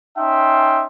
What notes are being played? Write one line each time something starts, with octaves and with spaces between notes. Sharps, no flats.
C#4 D#4 E5 G5 A5 C6